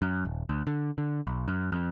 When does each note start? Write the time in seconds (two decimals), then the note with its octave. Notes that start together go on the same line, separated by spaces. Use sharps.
0.02 F#2
0.25 D#1
0.49 D2
0.67 D3
0.98 D3
1.27 B1
1.48 F#2
1.72 F2